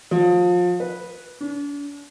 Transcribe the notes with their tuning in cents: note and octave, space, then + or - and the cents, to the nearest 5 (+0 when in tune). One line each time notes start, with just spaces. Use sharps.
F3 +30
B4 -10
D4 -40